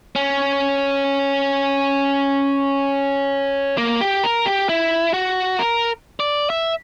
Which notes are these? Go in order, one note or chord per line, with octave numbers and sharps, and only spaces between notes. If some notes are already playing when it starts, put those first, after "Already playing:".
C#4
A#3
G4
A#4
G4
E4
F#4
A#4
D5
E5